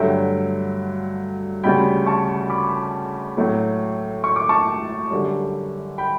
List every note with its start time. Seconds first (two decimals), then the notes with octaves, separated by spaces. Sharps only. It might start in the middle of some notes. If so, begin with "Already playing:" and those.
Already playing: G2 D3 F#3 A3 E5 G5
1.63 D2 C#3 G3 G5 B5
2.06 A5 C#6
2.50 B5 D6
3.37 A2 F#3 A3
4.24 C#6
4.36 D6
4.49 A5 C#6
5.11 F#2 D3 G3
5.98 G5 B5